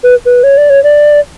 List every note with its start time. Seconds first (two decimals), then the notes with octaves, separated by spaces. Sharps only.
0.03 B4
0.26 B4
0.43 C#5
0.57 D5
0.70 C#5
0.84 D5